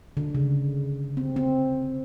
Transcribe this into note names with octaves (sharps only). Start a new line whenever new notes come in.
D3
C#3
C4
C4